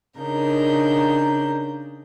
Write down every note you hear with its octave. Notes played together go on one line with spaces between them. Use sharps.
C#3 D4 D#4 A#4 G6